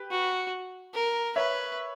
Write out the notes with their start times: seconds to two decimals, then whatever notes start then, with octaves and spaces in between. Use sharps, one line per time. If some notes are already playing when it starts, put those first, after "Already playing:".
Already playing: G4 B4
0.11 F#4
0.94 A#4
1.36 B4 C#5 E5